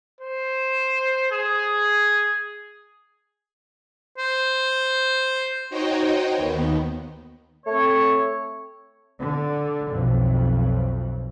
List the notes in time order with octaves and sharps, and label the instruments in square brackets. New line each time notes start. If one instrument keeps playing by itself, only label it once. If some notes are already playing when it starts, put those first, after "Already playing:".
[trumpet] C5
G#4
[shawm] C5
[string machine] D#4 F#4 C5 C#5 D#5 G5
D#2 D#3 B3
[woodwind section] A3 C4 C#5
[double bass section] D3
B1 F2